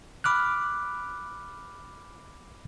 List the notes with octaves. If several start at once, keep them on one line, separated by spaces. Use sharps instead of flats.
B5 D6 F6 F#6